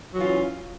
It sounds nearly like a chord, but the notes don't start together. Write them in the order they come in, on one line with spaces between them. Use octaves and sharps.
F#3 E3 F4 C#4